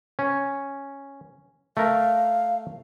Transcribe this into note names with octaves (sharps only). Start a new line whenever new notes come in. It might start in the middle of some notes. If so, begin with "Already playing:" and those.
C#4
A3 A#4 F5